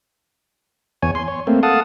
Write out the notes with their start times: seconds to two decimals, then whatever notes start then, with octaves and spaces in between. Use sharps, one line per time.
1.02 E2 C#5 G#5
1.15 C6
1.28 C#5
1.47 A3 A#3 C4
1.63 A4 F5 F#5 A5 D#6